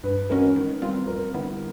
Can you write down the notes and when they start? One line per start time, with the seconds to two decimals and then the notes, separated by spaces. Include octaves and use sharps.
0.04 G2 B4
0.29 E3 G#3 C#4 F#4 A#4
0.56 D#3
0.82 G3 C4 F4
1.08 F2 A#4
1.34 D3 G3 B3 E4